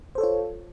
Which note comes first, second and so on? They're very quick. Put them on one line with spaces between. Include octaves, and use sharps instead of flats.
C5 A4 C#5 F4